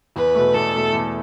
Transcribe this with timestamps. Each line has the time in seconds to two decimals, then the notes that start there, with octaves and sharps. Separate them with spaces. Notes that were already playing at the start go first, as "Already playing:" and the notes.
0.16 E2 B4
0.35 B2 A3
0.54 E2 A4
0.74 B2 A3
0.93 E2